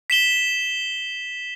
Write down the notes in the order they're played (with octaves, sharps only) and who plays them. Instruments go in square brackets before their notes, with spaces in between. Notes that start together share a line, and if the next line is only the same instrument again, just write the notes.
[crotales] B6 E7 G7